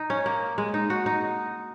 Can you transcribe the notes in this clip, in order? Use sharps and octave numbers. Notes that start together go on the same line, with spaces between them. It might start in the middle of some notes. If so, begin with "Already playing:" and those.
Already playing: D#4
C#4
A#3
G#3
D#4
F#4
D#4